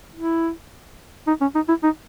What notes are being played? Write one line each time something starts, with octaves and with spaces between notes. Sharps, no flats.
E4
D#4
C#4
D#4
E4
D#4